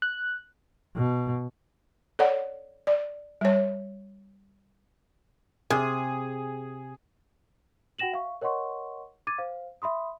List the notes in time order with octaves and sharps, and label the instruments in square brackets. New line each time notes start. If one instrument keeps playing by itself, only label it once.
[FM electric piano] F#6
[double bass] B2
[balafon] A4 C#5 D5 F#5
D5
G3 C#5
[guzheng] C3 [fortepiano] G#4
[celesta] F#4 F#5 G5 A#6 E7 F#7
E5 F5 C#6
A#4 C#5 D#5 F#5 C6 C#6
D6 G#6 A6 D#7
C5 F5
E5 B5 C6 D#6